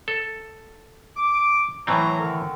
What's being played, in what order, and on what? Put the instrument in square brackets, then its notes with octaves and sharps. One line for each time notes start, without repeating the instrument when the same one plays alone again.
[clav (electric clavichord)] A4
[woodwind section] D6
[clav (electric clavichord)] A2 E3 C4 [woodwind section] F#3 C#5 A#5
[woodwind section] D3 D#3